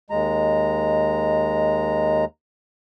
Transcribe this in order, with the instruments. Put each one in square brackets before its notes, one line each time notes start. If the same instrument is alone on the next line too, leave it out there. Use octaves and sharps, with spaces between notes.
[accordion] D#2 G#3 A#5